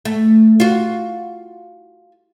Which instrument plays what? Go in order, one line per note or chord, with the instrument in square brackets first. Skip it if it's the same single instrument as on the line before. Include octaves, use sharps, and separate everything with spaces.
[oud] A3
F4 F#4